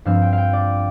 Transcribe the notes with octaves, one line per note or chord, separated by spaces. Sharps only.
G2 F3 C4 F5
G5
F5
G5
D5